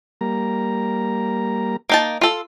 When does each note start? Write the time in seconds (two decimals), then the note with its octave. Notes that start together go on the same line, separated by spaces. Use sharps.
0.21 G3 A#3 A#5
1.89 A#3 D#4 A5
2.21 F4 A4